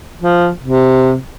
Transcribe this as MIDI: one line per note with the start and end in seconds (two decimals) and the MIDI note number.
0.22 0.50 53
0.63 1.16 48